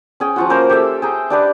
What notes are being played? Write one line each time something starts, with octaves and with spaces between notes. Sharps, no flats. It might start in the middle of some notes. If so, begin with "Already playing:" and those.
C#4 G#4 G5
F3 F4 F#4
A#3 C#4 A#4 C5
G4 A4 E5
G#4 G5 A#5
D4 G4 B4